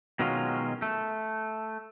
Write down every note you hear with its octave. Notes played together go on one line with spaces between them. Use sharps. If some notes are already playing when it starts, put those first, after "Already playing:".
B2 D#3 F#3 G#3 C#4 F4
A3